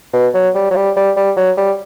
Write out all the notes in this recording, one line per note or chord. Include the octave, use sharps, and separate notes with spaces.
B2
F#3
G3
F#3
G3
G3
G3
F#3
G3